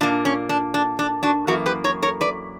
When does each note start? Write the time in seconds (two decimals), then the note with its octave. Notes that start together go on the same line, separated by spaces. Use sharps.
0.01 A#2 A#3 D4
0.25 C#4
0.49 D4
0.74 D4
0.99 D4
1.23 D4 F#4
1.47 F#2 E3 A#3 F#4 A#4
1.66 G4 B4
1.84 A#4 C#5
2.03 A#4 C#5
2.21 B4 D5